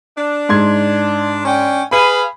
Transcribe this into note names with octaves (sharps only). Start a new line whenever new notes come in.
D4
G#2 C6 G#6
C#4 D4 G5
G#4 B4 F5 B5